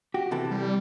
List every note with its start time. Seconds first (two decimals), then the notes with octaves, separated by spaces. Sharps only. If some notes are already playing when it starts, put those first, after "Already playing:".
0.14 F#4 G4
0.31 C3 E3 A4
0.51 G3